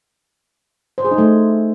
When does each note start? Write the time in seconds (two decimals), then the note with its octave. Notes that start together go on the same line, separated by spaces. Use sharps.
0.98 C5
1.05 G#4
1.11 D#4
1.18 A3